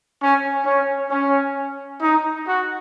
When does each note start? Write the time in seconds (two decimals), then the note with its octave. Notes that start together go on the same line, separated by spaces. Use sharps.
0.21 C#4
0.66 C#4
1.11 C#4
2.01 D#4
2.46 F#4